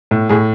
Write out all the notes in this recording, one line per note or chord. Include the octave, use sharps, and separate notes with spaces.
A2
A2 G#4